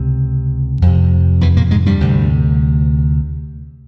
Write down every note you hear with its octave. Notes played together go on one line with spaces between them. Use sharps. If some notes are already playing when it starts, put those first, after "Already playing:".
Already playing: C#2 C3
F2 C3
E2 E3
A#2 A#3
G#2 G#3
G2 G3
D2 C3